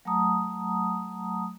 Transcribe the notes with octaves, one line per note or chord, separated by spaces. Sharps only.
F#3 A3 F#5 A5 A#5 D#6